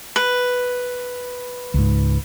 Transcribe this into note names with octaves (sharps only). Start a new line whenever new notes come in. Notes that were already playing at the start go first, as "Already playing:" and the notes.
B4
C#2 G#2